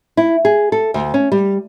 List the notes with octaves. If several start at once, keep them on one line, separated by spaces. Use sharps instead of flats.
E4
G#4
A4
D2
C#4
G3